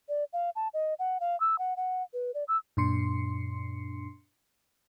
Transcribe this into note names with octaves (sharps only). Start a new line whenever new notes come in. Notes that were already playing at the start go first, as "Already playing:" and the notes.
D5
F5
A5
D#5
F#5
F5
E6
F#5
F#5
B4
D5
E6
F#2 A#2 D4 C6 C7 C#7